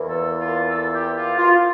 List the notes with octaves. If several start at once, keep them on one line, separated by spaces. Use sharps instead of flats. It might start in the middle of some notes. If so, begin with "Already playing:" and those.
Already playing: E2 E3 A#3
A4
F4
A4
G4
F4
F4